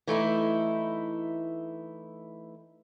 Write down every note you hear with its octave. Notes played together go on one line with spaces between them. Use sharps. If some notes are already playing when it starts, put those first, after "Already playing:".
E3 A3 D#4 E4